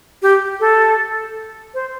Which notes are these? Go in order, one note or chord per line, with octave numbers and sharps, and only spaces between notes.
G4
A4
C5